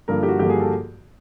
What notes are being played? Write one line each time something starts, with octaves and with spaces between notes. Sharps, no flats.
G2 D3 F3 A#3 A#4
G4
F#4
G2 D3 F3 A#3 G4
G#4
A4